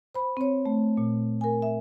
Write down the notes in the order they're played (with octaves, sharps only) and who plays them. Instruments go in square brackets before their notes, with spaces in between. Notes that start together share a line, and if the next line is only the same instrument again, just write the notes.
[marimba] C5 B5
C4 C#5
A3
A#2
A#4 G#5
E5